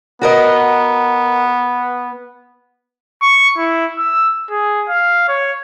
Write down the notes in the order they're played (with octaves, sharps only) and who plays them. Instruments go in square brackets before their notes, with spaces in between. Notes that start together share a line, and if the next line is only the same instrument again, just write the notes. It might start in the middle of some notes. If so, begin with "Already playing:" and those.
[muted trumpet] B3 [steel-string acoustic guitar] F#4 A#4 D#5
[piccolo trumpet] C#6
E4
E6
G#4
F5
C#5